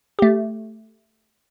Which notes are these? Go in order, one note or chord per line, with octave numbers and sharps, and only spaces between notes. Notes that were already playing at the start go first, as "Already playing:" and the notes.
A3 G4